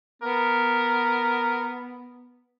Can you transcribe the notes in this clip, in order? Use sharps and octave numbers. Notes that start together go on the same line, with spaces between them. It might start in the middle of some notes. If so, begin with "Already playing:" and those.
B3 A#4